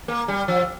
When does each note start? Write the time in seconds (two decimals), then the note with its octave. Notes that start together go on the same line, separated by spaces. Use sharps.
0.08 A#3
0.28 G3
0.48 F3